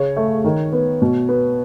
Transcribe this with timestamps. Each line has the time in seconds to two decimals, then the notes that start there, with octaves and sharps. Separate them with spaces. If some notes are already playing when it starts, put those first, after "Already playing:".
Already playing: C#3 C#5
0.17 A3
0.44 D#3
0.72 B3
1.02 B2
1.29 B3